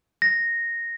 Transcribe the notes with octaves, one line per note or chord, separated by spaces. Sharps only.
A#6